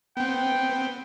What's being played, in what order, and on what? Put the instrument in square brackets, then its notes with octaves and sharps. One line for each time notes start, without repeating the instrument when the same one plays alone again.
[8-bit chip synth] B3 C4 [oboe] G5